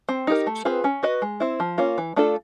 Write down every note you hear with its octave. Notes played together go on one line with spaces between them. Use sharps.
C4
D#4 G4 A#4
A3
C4 F4 G#4 B4
C#4
F#4 B4 D#5
G#3
C4 E4
F3
A#3 C#4 F4
E3
A3 D4 F4 A4